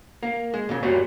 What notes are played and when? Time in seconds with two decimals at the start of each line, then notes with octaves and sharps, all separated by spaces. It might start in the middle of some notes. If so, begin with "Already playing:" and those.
0.23 A#3
0.54 G#3
0.69 A#2 C#3
0.83 F#2 A#2 F#3 G3